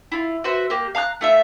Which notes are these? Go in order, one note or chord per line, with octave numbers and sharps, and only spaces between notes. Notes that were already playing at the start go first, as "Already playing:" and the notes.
E4 F4
F#4 B4 C5 E5
A#3 G4
F5 A#5 D6 F#6
A3 F4 E5